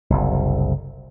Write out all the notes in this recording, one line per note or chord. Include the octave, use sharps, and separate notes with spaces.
F#1 C2